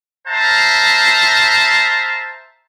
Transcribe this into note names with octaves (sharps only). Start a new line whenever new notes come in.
C5 E5 F5 A5 A#5